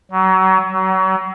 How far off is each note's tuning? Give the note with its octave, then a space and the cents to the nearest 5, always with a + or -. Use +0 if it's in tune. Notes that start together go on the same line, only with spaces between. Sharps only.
F#3 +30
F#3 +35